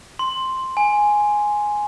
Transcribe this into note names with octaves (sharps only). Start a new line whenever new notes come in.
C6
G#5